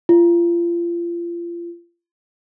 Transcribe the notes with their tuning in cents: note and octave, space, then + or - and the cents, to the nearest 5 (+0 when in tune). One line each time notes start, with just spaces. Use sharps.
F4 -30